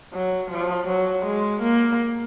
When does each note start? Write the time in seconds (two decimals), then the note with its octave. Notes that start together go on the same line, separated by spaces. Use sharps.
0.13 F#3
0.51 F3
0.88 F#3
1.26 G#3
1.62 A#3